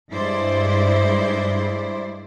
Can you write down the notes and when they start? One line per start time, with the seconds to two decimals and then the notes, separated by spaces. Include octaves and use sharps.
0.11 G2 G#3 E4 C5 D5